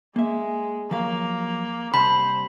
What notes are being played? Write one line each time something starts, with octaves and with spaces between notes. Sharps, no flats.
G#3 A#3 E5
F3 F#3 A#3 F5
C3 G3 C5 A5 B5